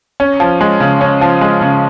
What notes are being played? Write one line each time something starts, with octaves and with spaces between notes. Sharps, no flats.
C#4
F3
G#3
C#3
C#4
F3
G#3
C#3